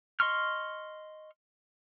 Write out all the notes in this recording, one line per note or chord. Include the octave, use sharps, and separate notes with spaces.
D#5 C6 C#6 F6